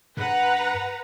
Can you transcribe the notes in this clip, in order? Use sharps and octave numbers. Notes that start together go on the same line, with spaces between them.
G2 B4 F#5 A#5